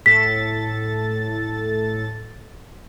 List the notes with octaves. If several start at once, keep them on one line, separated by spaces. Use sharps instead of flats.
A2 A4 A6 B6